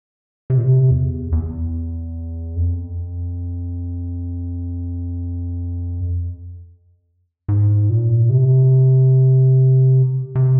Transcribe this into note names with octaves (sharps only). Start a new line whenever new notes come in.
C3
A#2
C3
E2
E2
F2
G#2
A#2
C3
C3